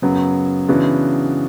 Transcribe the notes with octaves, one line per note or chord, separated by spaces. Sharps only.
F#2 C#3 F#3 B3
C#3 E3 B3 D4 F#4